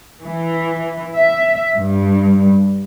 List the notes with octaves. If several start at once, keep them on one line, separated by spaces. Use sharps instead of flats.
E3
E5
G2